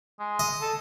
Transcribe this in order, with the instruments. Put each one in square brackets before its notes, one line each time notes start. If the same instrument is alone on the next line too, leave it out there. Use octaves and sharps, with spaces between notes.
[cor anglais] G#3
[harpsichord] D#5
[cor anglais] A4